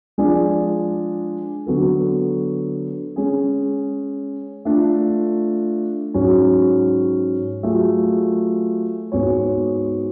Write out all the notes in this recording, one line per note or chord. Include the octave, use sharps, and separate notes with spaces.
F3 G#3 D4 G#4 D5
D3 F#3 B3 F#4 A4
G#3 C#4 G#4
A3 D4 F4
G#2 F#3 C#4
F#3 A3 F4 G#4
G#2 G#3 B3 F#4 C#5